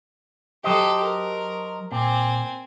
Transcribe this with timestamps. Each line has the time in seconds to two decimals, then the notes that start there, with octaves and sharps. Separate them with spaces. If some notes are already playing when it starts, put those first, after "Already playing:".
0.64 F#3 G4 A4 C5 D#5
1.02 A#4
1.92 A#2 C4 G#5